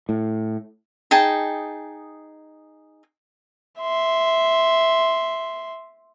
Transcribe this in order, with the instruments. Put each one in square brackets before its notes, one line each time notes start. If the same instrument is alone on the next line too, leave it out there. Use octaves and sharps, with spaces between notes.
[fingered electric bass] A2
[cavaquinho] D#4 G#4 G5 A5
[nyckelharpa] E5 C6